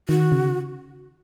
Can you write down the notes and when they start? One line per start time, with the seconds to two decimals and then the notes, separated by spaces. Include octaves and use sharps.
0.09 D#3 F#4
0.32 C#3